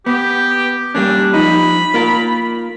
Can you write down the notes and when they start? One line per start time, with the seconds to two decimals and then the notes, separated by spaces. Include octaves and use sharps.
0.06 B3 G4
0.95 G3 A#3 C#4 D4
1.34 F3 D#4 B5
1.94 A#3 F4 A#4